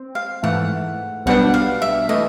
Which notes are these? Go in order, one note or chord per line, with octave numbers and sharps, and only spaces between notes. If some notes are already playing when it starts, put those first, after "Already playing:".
Already playing: C4
F5
G#2 E3 A3 F#5
B1 B2 G3 B3 D4 F#5
F5
E5
E3 A3 D#5